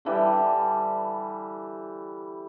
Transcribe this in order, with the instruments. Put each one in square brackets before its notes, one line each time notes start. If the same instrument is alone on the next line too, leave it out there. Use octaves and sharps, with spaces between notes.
[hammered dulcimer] D3 E3 G3